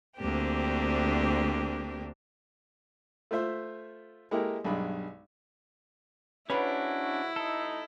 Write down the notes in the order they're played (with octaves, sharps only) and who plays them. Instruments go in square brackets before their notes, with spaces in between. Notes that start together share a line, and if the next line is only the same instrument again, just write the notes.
[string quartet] D2 A#3 C4 D4 G4
[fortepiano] A3 F4 C5 E5
G#3 A#3 E4 G4 A4 A#4
B1 G2 G#3 B5
[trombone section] G#2 F#4 [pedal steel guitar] C#4 D4 [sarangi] E4 [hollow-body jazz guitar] B4 C#5 B5
[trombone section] A1 A3 D#4 [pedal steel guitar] A4